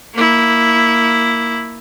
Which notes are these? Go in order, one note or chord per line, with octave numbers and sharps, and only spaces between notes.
A#3 E4